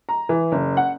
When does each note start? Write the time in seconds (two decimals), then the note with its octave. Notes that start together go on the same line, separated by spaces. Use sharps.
0.09 A#5
0.29 E3
0.52 F#1
0.77 F#5